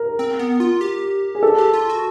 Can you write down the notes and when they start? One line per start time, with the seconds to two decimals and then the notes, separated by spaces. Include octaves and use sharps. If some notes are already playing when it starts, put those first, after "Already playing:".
Already playing: A#4
0.19 C4
0.39 B3
0.60 F4
0.81 G4
1.35 G#4
1.43 A4
1.58 G4
1.73 F4
1.90 F#4